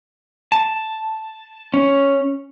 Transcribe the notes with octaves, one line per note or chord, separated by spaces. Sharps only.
A5
C#4